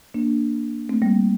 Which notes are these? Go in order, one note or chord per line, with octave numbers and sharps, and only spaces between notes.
A#3 D4
A3 C4
G3 A#3